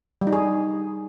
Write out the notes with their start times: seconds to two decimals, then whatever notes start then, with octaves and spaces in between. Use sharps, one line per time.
0.21 G3
0.27 D#4
0.32 G#4